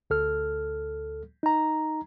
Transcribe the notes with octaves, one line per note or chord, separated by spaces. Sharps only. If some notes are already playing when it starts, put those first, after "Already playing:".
D2 A4 F6
D#4 A#5